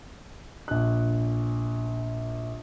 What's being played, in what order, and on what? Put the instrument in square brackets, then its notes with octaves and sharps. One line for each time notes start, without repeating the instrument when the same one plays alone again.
[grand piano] A#1 F#6